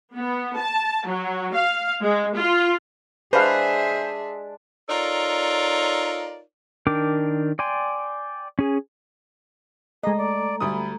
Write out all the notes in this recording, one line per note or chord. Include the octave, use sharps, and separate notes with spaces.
B3
A5
F#3
F5
G#3
F4
G#3 D4 G#4 B4 C5 E5 F5
D#4 F4 A4 A#4 C#5 D5
D#3 D4 A#4 G5 D6
D5 G5 G#5 C6
C#4 G#4
G#3 A3 G#4 A4 D#5 A#5
D5
D2 G3 B5 D#6